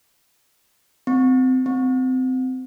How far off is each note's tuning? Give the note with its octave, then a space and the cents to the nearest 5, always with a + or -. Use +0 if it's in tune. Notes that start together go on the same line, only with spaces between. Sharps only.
C4 -25
C4 -25